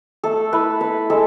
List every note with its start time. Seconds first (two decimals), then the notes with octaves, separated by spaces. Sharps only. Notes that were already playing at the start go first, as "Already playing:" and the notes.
0.24 A3 A4
0.52 E4 B4
0.81 E4 B4
1.10 G#3 A4